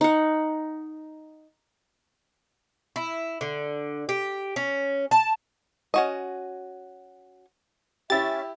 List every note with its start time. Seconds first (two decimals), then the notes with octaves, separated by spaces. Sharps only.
0.01 D#4 F#5
2.96 E4
3.41 D3
4.09 G4
4.56 C#4
5.11 A5
5.94 C#4 F#4 D#5
8.10 C#4 E4 G4 E5 A6